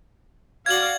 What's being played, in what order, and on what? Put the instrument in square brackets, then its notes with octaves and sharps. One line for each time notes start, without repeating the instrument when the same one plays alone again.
[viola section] F#4 D5 F5 [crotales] G#6 F#7